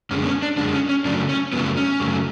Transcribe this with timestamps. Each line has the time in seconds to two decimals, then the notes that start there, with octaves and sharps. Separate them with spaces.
0.10 F#2 D3 G#3 C#4
0.22 B3
0.26 C#4
0.42 D4
0.57 F#2 D3 G#3 D4
0.73 C#4
0.89 C#4
1.05 F#2 C#3 F#3 A3 D4
1.29 C#4
1.53 F#2 C#3 F#3 A3 B3
1.77 C#4
2.00 F#2 C#3 F#3 A3